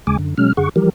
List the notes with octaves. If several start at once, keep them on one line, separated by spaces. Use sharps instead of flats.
D#2 C#3 G#3 G#5 D6
F#2 D3
B2 F#3 G#3 C#4 F6
F#2 D3 G#4 F#5 C#6
E3 F3 G3 G4 A#4